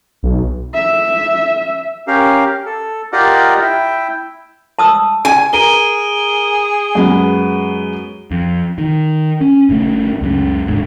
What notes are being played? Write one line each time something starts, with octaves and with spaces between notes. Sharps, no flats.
B1
E5
C#4 G4 A#4 F5
A4
F4 G4 A#4 D5 D#5 F#5
E4 E5 G5
A5 D#6 E6
G#5
G#4 A#4 A#5 D7 D#7 G7
F#2 G#3 B3
F2
D#3
C#4
G1 C#3 A3
C#2 F#2 C#3
D#1 G#1 G#2 D3